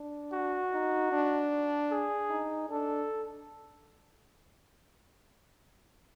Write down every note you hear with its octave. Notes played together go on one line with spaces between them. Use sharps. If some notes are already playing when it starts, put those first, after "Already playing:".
Already playing: D4
F#4
D#4
D4
G#4
D#4
D4 A4